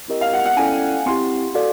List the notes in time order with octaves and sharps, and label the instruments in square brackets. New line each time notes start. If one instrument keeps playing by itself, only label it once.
[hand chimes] C4 E4 G4 A#4 D#5
[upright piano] F5
F#5
F#5
[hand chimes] C#4 E4 A4 D5 G5 [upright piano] G#5
[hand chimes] C4 E4 G4 [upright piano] C6
[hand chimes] F#4 A4 D5 F5